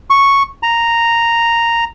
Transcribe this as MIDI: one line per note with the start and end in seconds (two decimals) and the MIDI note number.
0.10 0.43 85
0.63 1.84 82